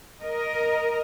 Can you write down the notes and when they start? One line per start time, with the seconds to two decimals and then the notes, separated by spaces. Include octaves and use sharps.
0.24 A#4 D#5